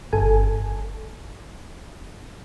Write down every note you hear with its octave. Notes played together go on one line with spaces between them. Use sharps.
G1 A4 G#5